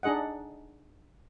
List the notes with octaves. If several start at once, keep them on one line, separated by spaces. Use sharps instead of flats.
D4 D#4 G#4 D#5 F#5